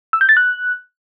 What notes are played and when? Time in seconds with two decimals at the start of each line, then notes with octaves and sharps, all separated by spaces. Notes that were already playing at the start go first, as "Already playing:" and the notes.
0.13 E6
0.21 G6
0.29 A6
0.37 F#6